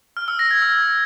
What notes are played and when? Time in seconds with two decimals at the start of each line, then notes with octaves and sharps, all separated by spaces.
0.17 F6
0.28 E6
0.39 A#6
0.51 G#6
0.62 E6